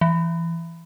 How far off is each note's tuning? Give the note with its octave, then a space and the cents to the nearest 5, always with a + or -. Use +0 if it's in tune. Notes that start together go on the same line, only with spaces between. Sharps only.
E3 +20